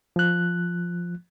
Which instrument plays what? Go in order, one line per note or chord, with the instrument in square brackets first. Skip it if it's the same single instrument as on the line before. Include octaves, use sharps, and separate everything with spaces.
[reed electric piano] F3 F#6